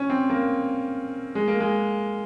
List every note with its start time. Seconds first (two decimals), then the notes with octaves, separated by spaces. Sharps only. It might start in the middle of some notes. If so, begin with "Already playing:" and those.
Already playing: C#4
0.10 C4
0.30 A#3
1.35 G#3
1.48 A#3
1.60 G#3